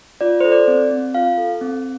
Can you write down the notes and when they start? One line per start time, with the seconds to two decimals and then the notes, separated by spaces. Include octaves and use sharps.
0.21 F4 D5
0.41 A4 C5
0.52 D5
0.67 C4
0.91 C4
1.14 F4 F5
1.38 A4
1.61 C4